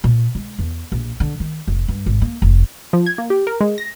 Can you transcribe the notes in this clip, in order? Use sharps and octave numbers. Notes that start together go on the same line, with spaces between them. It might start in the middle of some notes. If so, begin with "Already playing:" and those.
A#2
G#3
E2
A#1
D3
D#3
F1
G2
G#1
A#3
F1
F3
G#6
A#3
G4
A#4
G#3
A#6